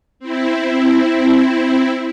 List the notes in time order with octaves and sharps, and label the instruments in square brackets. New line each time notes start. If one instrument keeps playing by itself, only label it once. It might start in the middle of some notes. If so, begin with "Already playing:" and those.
[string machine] C4 E4